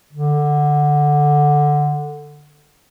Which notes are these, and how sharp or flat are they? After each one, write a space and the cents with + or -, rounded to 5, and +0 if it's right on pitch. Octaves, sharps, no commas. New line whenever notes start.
D3 +5